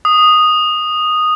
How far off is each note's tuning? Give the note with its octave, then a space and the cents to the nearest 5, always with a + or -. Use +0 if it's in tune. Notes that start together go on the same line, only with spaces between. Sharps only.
D#6 -5